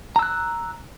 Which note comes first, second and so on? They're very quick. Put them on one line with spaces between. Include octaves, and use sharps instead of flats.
A#5 E6 F#6